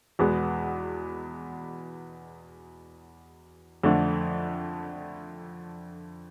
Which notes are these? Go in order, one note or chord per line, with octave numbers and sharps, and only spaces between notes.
E2 B2 G#3 B3
F2 D3 A3 D4